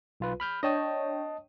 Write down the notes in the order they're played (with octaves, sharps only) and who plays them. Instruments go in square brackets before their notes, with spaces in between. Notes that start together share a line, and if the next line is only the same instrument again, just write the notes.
[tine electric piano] B1 F4 B4
B5 F6 G6
[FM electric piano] D4 C#5 G5 [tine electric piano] D#5 A5 D#6